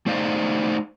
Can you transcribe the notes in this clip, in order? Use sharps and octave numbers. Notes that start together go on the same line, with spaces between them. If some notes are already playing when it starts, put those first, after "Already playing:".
A3 D#4 C5 D5 D#5 F5